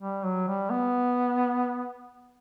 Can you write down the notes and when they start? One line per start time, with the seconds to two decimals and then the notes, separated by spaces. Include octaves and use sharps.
0.01 G3
0.24 F#3
0.47 G3
0.70 B3